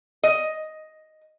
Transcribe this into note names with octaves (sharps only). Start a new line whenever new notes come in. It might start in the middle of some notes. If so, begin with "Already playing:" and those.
D#5